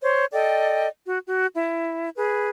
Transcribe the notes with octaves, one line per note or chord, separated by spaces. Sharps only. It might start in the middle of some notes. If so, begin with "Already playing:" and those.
C5 C#5
A4 D5 D#5 G5
F#4
F#4
E4
G#4 B4